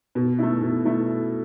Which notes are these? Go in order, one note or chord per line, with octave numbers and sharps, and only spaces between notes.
B2
A3 E4
B2
A3 E4